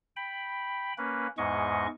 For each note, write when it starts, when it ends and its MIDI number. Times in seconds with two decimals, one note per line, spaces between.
0.16 0.93 79
0.16 0.93 83
0.98 1.27 58
0.98 1.27 61
0.98 1.27 71
1.38 1.87 40
1.38 1.87 44
1.38 1.87 56
1.38 1.87 75
1.38 1.87 85